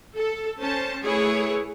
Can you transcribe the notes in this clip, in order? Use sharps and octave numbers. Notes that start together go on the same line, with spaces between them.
A4
C#4 C5 A5
A3 E4 G#4 B4 C#5